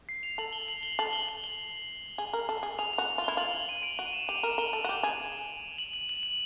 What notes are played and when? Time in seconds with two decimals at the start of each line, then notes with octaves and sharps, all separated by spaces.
0.09 C7
0.23 F7
0.38 A4 F#7
0.53 G7
0.68 F#7
0.83 G7
0.99 A4 F#7
1.13 G7
1.29 F#7
1.44 G7
2.18 G#4
2.33 A#4
2.49 A4
2.63 G#4
2.79 G#4 F7
2.93 F7
2.98 F#4
3.18 F4
3.24 G7
3.28 E4
3.37 F4 F#7
3.54 F7
3.69 D#7
3.83 D7
3.99 F#4 D#7
4.13 E7
4.29 G4 F7
4.43 A#4 F#7
4.58 A#4 G7
4.73 A4
4.84 F#4
4.89 G4
5.03 G#4
5.78 F#7
5.93 F#7
6.09 F#7
6.23 F#7